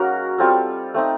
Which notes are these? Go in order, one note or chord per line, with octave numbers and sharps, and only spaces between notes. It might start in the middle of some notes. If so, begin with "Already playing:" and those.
Already playing: F#3 A#3 C#4 D#4 F#4 G#4 A#4
G3 C4 F4 A4
A3 C4 D#4